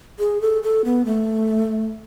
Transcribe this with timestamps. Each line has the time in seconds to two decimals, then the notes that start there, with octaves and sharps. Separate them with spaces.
0.19 G#4
0.41 A4
0.63 A4
0.85 B3
1.05 A3